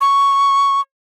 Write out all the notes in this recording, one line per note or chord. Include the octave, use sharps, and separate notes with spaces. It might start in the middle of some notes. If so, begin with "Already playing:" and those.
C#6